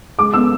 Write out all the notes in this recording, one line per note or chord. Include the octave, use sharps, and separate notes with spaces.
G#3 D6
B3 E6